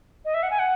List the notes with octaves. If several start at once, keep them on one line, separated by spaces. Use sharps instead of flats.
D#5
E5
F#5
G#5
F#5